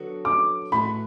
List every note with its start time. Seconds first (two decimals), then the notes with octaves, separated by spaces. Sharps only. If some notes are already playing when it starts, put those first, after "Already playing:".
Already playing: D3 F#3 B3 F#4 A4
0.25 D6
0.72 A2 E3 A3 F#4 B5